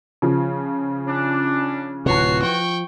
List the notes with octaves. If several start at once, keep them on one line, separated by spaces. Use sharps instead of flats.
C#3 F3
C#4 D4
D1 C3 E3 F4 F#4 C#5 C7
F3 G5 C#6